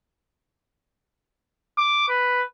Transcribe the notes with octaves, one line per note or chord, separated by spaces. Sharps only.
D6
B4